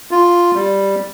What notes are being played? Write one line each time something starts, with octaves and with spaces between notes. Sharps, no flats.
F4
G3